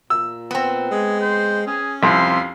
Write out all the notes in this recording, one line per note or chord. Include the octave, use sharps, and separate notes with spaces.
A#2 E6
B3 C4
G#3 G#4
C5
C#4 G#4
C2 F2 C6